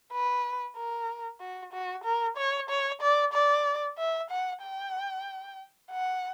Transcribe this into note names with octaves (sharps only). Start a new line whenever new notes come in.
B4
A#4
F#4
F#4
A#4
C#5
C#5
D5
D5
E5
F#5
G5
F#5